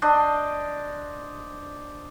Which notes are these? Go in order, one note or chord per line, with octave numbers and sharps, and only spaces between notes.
D4 C5 D#5